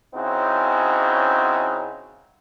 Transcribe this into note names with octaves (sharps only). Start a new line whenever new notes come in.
C#3 C4 C#4 D#4 E4 F#4